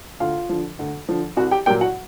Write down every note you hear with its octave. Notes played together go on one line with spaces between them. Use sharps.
D2 F4 F5
D3 F3
D2
D3 F3
C2 F#4 F#5
G4 G5
A#2 F#3 G4 G5
F#4 F#5